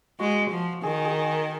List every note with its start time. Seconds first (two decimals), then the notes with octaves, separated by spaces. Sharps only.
0.19 G#3 F#4
0.51 F3
0.83 D#3 G#4
1.05 G#4